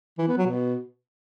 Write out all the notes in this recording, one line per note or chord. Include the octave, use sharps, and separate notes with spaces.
E3
B3
F#3
B2